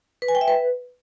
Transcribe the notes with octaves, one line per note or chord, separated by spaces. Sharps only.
B4
G#5
G5
E5
B4